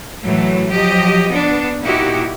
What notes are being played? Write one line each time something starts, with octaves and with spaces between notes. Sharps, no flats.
A2 E3 F#3 A3
F3 F#3 G4 D#5
B3 D4
A#2 D#4 E4 F#4 G4